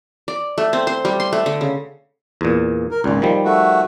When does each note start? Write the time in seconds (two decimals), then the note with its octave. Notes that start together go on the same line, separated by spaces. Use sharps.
0.28 D5
0.58 A3
0.73 C4
0.87 C5
1.05 G3
1.20 C6
1.33 A3
1.46 D3
1.61 C#3
2.41 E2 A#2
2.91 A#4
3.04 G#1 C#2 A#2
3.22 D#3 F3 G3
3.45 A3 F#4